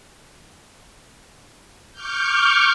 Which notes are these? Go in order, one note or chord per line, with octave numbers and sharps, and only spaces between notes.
C#6 D6 F6 G6